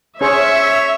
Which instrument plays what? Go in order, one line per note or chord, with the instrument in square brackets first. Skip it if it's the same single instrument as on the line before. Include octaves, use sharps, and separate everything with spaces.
[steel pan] C#4 G#4 C5 [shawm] C#5 [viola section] E5